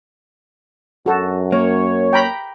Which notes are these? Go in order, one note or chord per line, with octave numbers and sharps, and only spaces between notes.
F#2 F#4 A4
A#3 C#5
G5 A#5 B5